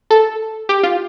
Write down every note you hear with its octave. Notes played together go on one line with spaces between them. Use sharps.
A4
G4
F4